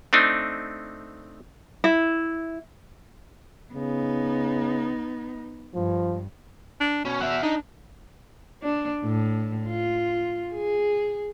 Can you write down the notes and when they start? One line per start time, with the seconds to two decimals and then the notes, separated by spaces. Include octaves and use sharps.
0.13 A3 C4 D4 D#4
1.84 E4
3.74 C#3 B3 D#4
5.75 G2 F3
6.80 D4
7.05 B2 C#4
7.21 E5 F#5
7.43 D4 D#4
8.62 D4
9.04 A2
9.67 F4
10.53 G#4